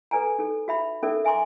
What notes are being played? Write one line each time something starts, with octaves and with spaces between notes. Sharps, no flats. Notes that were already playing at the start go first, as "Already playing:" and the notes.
A4 B4 D5 G#5 A#5
D#4 A4
F#4 E5 B5
C#4 D#4 A4 A#4 D5 E5
E5 G#5 A#5 C6 D6